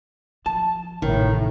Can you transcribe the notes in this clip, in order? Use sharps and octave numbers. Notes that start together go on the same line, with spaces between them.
F3 A5
A1 A2 C3 D#3